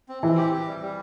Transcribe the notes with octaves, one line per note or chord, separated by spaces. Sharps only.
C4
E3 C4
G4
G4
G3
G3